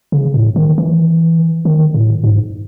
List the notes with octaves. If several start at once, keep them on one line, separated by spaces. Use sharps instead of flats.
C#3
A2
D#3
E3
D#3
A2
G#2